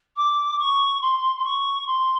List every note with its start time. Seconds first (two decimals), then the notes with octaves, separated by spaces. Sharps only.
0.16 D6
0.59 C#6
1.01 C6
1.38 C6
1.44 C#6
1.86 C6